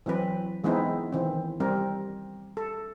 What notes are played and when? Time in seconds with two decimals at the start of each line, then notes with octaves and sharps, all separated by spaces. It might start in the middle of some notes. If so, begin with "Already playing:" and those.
0.06 E3 F#3 C4 B4
0.64 E3 G#3 B3 C4 D#4 E4
1.12 D#3 E3 C4
1.60 G3 C4 A#4
2.57 A4